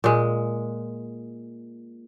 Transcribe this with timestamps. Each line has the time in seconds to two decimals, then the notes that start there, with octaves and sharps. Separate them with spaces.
0.04 A#2 G#3